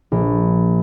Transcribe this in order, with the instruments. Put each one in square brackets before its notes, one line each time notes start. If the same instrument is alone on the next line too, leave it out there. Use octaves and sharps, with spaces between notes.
[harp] A#1